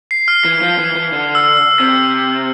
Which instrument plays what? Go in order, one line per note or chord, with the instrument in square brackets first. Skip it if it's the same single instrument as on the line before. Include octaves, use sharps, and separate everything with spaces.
[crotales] C7
F6
[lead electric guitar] E3
F3
E3
E3
D3
[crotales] E6
E6
[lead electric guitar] C3